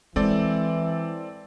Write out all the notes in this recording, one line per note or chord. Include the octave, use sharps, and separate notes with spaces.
E3 G#3 C4 A4 D5